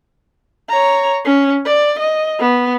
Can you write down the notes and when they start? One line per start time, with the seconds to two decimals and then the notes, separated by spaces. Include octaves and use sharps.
0.70 C#5 A#5
1.25 C#4
1.66 D5
1.99 D#5
2.40 B3